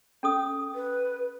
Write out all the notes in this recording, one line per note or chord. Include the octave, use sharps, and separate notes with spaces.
C#4 A4 D#6
B4